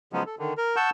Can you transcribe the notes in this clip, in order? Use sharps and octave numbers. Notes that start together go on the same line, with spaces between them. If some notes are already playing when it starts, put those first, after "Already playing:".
C#3 F3 F#3 G#3 B3 C#4
A4
D3 D#3
A#4
F#5 A5 C#6 E6 G6